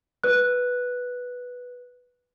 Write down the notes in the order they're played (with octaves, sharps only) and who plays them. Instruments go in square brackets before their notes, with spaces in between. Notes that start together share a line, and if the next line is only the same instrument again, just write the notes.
[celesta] B4 F#6